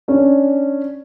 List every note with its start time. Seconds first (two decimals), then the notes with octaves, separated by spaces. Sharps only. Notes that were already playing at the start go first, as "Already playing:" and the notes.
0.08 C#4 D4